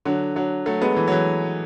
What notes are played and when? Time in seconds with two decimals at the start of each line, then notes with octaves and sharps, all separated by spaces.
0.05 D3 F#3
0.36 D3 F#3
0.66 F#3 A3
0.81 G#3 B3
0.96 E3
1.08 F#3
1.12 E3